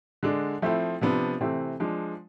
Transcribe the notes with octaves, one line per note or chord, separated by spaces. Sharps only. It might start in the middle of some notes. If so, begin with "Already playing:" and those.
D3 G#3 D4
F3 A3 C4 E4
C3 F3 B3 D4
C3 E3 A3 C4
F3 G#3 D4